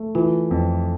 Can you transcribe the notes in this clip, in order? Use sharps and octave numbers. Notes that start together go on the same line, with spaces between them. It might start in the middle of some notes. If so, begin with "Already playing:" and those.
Already playing: A3
E3 F4
F2